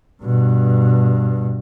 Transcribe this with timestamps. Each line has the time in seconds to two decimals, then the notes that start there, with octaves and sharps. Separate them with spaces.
0.23 G2 B2